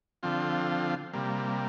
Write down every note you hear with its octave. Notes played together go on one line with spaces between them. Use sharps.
D3 F3 C4 F4
C3 G3 A#3